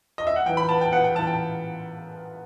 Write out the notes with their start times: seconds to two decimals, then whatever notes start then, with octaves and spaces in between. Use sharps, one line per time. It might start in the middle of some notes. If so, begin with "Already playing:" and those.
0.18 D#5
0.27 E5
0.36 F#5
0.46 E3 G5
0.57 B5
0.69 B3 A5
0.81 G5
0.92 B3 F#5
1.04 G5
1.15 E3 A5
1.27 G5